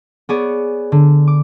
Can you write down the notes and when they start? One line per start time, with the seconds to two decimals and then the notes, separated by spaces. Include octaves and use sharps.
0.29 B3 G#4 C#5 D5
0.92 D3
1.27 D6